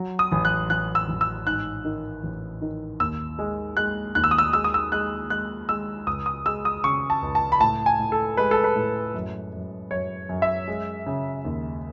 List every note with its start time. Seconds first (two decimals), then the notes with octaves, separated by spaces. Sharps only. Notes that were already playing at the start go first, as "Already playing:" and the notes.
Already playing: F#3
0.19 D#6
0.32 A1
0.45 F#6
0.70 A1 F#6
0.95 E6
1.08 A1
1.21 E6
1.46 G#2 F#6
1.85 D#3
2.23 A1
2.62 D#3
3.00 D#2 E6
3.39 G#3
3.77 G#3 F#6
4.15 D#2 F#6
4.24 E6
4.31 D#6
4.38 E6
4.53 G#3 E6
4.64 D#6
4.74 E6
4.92 G#3 F#6
5.30 G#3 F#6
5.69 G#3 E6
6.07 C#2 D#6
6.26 D#6
6.46 G#3 E6
6.65 D#6
6.84 C#3 C#6
7.10 A5
7.22 C#2
7.35 A5
7.52 B5
7.61 A2 A5
7.86 G#5
7.99 A2
8.12 A4
8.37 G#3 B4
8.51 A4
8.64 B4
8.76 A2
9.14 F#2
9.53 F#2
9.91 F#2 C#5
10.29 F#2
10.42 E5
10.68 G#3
11.06 C#3
11.45 D#2